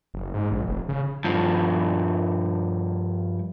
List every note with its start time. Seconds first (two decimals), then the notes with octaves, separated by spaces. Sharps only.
0.14 F#1
0.34 G#2
0.52 A#1
0.67 F1
0.89 C#3
1.25 G2 F3